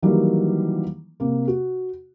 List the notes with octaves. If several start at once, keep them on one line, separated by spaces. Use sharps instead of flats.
D#3 E3 F#3 G3 A#3
C3 A#3
F#4